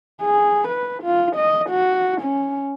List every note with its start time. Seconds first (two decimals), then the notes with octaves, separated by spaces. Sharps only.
0.23 G#4
0.69 B4
1.03 F4
1.37 D#5
1.70 F#4
2.22 C#4